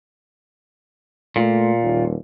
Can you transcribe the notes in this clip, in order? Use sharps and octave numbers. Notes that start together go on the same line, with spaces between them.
A#2 A3
D#1